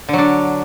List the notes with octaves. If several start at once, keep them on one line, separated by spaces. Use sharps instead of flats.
D3 F#3 D4